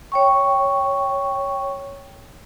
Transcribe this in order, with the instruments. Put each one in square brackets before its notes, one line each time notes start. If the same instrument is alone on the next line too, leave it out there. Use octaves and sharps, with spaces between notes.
[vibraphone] C#5 G5 C#6